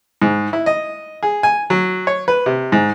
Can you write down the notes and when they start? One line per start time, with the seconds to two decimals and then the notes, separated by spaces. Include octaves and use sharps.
0.22 G#2
0.53 E4
0.66 D#5
1.23 G#4
1.43 G#5
1.70 F#3
2.07 C#5
2.28 B4
2.46 C3
2.72 G#2